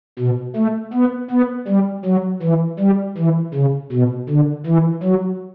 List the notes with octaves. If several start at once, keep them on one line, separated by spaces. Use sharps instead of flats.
B2
A3
B3
B3
G3
F#3
E3
G3
E3
C#3
B2
D3
E3
F#3